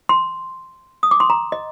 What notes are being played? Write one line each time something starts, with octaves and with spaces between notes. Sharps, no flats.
C6
D#6
D6
C6
A#5
D#5